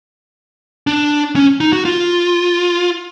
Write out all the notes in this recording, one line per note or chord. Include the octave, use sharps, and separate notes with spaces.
D4
C#4
D#4
F#4
F4